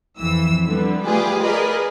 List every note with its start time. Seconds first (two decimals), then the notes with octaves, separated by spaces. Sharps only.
0.20 F2 E3 E6
0.66 D3 G3 B3
1.04 A3 F4 G4 G#4 B4 D5
1.42 G#4 A#4 B4 D5 D#5